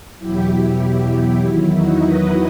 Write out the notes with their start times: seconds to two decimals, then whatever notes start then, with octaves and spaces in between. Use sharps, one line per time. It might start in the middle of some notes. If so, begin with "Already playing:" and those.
0.19 E2 B2 F#3 E4 G4
0.81 E4 G4
1.42 E2 D#3 F#3 E4
1.73 D#4 F#4
2.04 B4 D#5